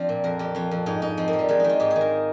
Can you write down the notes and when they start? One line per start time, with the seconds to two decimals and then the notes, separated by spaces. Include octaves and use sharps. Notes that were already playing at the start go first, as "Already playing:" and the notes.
Already playing: F3 C4 D4
0.09 A#2
0.24 F2 A#4
0.39 F2 G4
0.55 F2 F4
0.71 F2
0.86 G#2 D#4
1.02 G#2 D#4
1.17 F3 C4
1.28 A#3
1.33 F3
1.39 G3
1.49 D#3 G#3
1.60 D#3 D#4
1.69 F4
1.80 G#2 G4
1.91 G#4
1.96 D#3
2.01 A#4